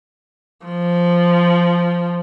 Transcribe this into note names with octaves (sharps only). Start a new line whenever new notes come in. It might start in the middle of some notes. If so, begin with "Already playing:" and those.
F3